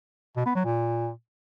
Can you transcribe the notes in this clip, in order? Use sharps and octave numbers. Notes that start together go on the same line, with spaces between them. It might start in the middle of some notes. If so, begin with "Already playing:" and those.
B2
B3
F#3
A#2